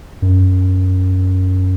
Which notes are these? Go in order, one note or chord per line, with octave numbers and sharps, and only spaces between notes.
F#2